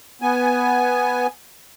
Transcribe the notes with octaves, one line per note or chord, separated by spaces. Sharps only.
B3 G#5